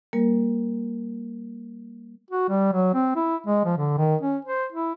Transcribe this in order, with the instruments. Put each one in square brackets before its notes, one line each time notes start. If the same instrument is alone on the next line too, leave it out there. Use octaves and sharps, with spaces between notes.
[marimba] G3 A#3 A#4
[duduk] F#4
G3
F#3
C4
E4
G#3
F3
D3
D#3
C#4
C5
E4